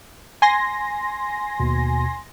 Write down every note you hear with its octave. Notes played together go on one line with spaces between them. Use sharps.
G#5 C6 A#6
D#2 B2